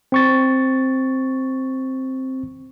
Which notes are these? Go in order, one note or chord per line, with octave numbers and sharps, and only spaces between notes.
C4 C#6 A6